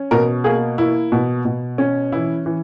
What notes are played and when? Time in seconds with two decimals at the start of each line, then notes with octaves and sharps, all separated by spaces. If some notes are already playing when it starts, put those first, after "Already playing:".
Already playing: C#4
0.11 B2 A#4
0.44 A#3 G#4
0.78 A#3 E4
1.12 B2
1.45 B2
1.78 C#4
2.12 E3 E4
2.46 E3